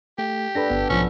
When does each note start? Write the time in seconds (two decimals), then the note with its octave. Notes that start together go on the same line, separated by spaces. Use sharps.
0.18 A3 G4
0.55 D4 A4 B4 A#6
0.70 G1 B3
0.89 B1 G#2 F3 C#4